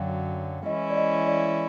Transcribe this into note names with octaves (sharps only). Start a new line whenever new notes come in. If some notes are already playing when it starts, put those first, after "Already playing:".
Already playing: F#2 D3 F#3 F5 G5
E3 G#3 C#4 E4 D#5
D5
D#5
D5